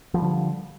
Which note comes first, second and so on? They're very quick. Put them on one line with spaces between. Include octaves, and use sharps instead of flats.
F3 G3 D3